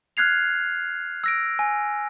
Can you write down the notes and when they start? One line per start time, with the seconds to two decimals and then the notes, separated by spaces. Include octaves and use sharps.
0.17 F6 F#6 G#6 C7 F7
1.24 E6 A#6 D7
1.59 G#5